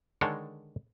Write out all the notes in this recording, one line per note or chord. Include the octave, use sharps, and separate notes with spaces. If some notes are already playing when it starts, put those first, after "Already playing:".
D3 D#3 G#3 A4 C#5